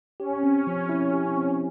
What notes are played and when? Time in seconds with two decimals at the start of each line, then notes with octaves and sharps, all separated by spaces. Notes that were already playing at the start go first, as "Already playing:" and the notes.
0.20 C#4 G4
0.43 C4
0.67 F3
0.89 E4
1.13 G4
1.37 C4